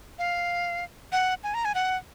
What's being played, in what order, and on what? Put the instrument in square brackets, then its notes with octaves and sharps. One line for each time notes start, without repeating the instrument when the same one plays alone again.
[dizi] F5
F#5
G#5
A#5
G#5
F#5